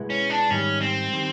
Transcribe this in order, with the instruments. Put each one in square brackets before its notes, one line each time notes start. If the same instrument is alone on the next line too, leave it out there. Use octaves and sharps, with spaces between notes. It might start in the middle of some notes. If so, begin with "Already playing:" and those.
Already playing: [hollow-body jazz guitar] B2 G#3 B3 E4
[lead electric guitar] C#4
D4
[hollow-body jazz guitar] G#2 D#3 G3 [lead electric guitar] C#4
[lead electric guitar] C4
[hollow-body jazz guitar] D#3 G3